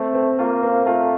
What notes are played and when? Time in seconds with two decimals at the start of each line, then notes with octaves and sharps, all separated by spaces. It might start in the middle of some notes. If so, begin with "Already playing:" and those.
Already playing: A3 C4
0.14 C4
0.38 A#3 F4
0.63 C4
0.86 A3 F4